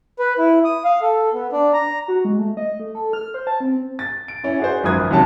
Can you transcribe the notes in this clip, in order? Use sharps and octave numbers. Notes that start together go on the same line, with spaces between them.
B4
E4
D#6
F5
A4
B3
D4
A#5
F#4
G#3
A3
D#5
A3
A4
F6
C5
A5
C4
A6
D7
C#4 E4
F#4 G#4 C5
G#1 F#2 F3 B4 D#6 G#6
D#2 C3 F#3 C#4 A5